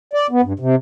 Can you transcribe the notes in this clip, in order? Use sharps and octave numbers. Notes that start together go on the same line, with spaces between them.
D5
B3
G2
C3